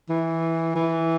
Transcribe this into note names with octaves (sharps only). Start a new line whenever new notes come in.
E3
E3